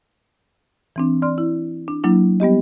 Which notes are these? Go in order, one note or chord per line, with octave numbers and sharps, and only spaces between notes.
E3 C4 D4
D5 C6 F6
E4
D4
F#3 A#3 D4 E4
G3 B3 G4 D#5